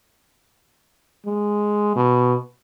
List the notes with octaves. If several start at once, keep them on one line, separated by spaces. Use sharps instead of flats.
G#3
B2